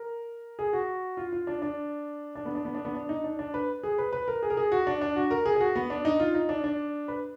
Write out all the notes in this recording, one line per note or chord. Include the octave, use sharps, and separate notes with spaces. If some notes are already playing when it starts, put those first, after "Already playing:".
Already playing: A#4
G#4
F#4
F4
F4
D4
D4
D4
B3
D4
B3
D4
B3
D4
D#4
D4
D4
B4
G#4
B4
B4
A#4
G#4
A#4
G#4
F#4
D4
D4
F#4
A#4
G#4
G#4
F#4
B3
D4
D#4
F4
D#4
D4
D4
B4